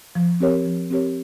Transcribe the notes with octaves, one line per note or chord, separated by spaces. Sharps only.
F3
C4 G4 A#4 C#5
F3
C4 G4 A#4 C#5